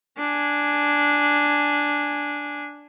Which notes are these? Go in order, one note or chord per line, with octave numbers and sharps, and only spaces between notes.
D4 G#5